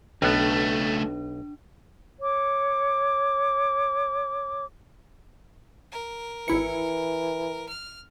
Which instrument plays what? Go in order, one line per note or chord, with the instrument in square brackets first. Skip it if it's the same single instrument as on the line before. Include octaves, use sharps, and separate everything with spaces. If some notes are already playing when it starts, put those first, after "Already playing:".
[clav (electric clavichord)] B1 B3 [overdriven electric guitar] C#3 A3 [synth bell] D4
[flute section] C#5 D6
[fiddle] A#4
[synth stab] G#1 E4 C#7 [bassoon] E3
[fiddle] F6